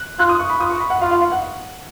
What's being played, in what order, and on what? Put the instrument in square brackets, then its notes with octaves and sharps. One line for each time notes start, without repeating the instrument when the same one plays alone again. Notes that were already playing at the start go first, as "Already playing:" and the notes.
Already playing: [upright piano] F#6
[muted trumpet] F4 [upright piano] F#6
[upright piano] D#6
C#6
B5
[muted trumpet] F4 [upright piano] D#6
[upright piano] C#6
B5
F#5
[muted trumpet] F4 [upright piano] F5
[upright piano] F5
F5
F#5